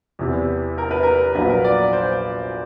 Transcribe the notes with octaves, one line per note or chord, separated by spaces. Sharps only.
E2 C3 E3
A#4
B4
A#4
A#1 A#2 F#3 B4
A#4
D5
C5